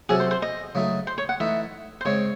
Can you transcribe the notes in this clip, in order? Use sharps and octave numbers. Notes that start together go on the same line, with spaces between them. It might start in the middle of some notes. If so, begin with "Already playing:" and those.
C3 F#3 C#4 F#4 G#4 A4
C5
C5
D#5
C#3 F#3 A3 D#4 G#4
C5
C#5
F#5
E3 A3 D#4 E5
C5
C#3 G#3 C4 C#5